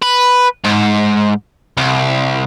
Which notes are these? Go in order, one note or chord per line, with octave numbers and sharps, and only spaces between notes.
B4
G#2
C2